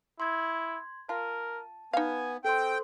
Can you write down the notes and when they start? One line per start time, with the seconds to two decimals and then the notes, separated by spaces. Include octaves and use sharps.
0.20 E4 C6 G#6
1.09 F4 A#4 A5
1.93 B3 D#4 F5 G#5
2.45 C4 A4 C5 G5 C6